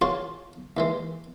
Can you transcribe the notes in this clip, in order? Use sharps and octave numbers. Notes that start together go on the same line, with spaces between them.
F4 F#4 G#4 C#5 A5
D#2 E3 G#3